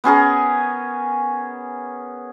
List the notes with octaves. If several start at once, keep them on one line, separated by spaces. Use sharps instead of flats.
B3 C#4 G#4 A#4